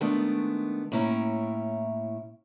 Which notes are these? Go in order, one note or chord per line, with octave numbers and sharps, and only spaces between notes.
D#3 G#3 A3 B3 D4
A2 A#3 C#4 E4 A#5